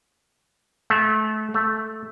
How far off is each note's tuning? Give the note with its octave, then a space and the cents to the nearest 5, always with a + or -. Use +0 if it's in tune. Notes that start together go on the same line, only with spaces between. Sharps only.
A3 -25
A3 -5